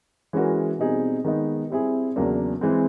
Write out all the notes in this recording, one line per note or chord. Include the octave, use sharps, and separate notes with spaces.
E3 G#3 C#4 F#4 A#4
B2 G3 C4 D#4 G#4
D#3 G#3 B3 D#4
G3 C4 E4 G#4
E2 C#3 F#3 A#3 D4
E3 G#3 C4